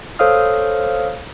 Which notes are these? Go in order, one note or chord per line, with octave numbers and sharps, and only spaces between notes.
A4 C5 C#5 F5 D#6 F6